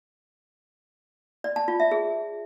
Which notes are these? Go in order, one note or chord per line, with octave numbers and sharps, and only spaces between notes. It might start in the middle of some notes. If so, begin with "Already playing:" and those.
D5
A5
F4
E5
G#4